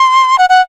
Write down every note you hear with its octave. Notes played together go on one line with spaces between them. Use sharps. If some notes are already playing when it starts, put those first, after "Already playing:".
Already playing: C6
F#5
F#5